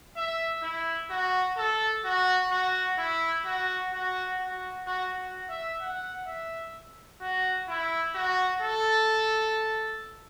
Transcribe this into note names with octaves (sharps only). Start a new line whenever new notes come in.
E5
E4
F#4
A4
F#4
F#4
E4
F#4
F#4
F#4
F#4
F#4
E5
F#5
E5
F#4
E4
F#4
A4